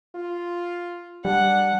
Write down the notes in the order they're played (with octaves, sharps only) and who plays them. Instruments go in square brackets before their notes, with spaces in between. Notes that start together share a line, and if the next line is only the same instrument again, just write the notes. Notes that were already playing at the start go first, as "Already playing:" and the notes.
[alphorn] F4
[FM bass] G3 [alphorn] D4 [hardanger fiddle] F#5